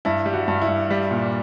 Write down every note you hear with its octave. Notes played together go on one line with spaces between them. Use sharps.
G2 E4
G3
F#4
G2
E4
G2
G3
A#2